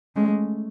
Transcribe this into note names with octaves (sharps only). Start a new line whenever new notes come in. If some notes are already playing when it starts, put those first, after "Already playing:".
G#3 A3 C#4